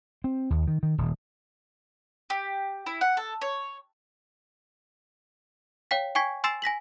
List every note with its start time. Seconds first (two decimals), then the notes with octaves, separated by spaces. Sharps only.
0.24 C4
0.50 D#2
0.68 D#3
0.83 D#3
0.98 D#1
2.30 G4
2.86 E4
3.01 F#5
3.17 A4
3.41 C#5
5.91 C#5 F5 G5 B6
6.15 G5 G#5 C#6 G#6 B6
6.44 G#5 C6 E6 A6 C7 E7
6.62 G#5 A#6 B6 F#7